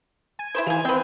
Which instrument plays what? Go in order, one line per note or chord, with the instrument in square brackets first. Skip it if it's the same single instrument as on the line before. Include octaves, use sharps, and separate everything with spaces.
[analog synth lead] G#5
[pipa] E4 B4 C5
[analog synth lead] E3 [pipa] F5 G#5
[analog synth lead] C4 [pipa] B4 G5